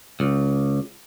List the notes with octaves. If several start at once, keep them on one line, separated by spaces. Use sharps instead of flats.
C#2